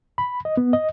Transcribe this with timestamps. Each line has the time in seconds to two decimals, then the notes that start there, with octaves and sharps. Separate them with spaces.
0.18 B5
0.45 D#5
0.57 B3
0.73 D#5